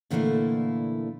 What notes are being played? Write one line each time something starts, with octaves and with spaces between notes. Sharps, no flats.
A#2 D3 E3 A3 A#3 E4